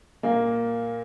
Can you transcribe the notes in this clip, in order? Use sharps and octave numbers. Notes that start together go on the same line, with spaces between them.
A#2 A#3